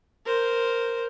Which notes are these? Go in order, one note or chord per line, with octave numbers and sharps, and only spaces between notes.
A#4 C5